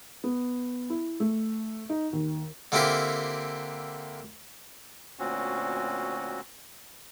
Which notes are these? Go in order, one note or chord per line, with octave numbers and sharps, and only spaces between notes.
B3
E4
A3
D#4
D#2
D3 A#3 C4 E4 G4 A#4
D2 A#2 C4 C#4 F#4